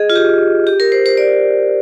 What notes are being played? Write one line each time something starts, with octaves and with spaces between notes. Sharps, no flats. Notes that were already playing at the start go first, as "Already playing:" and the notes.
Already playing: G#4 D#5
F4
G4
G4
A#4
C5
C5
D5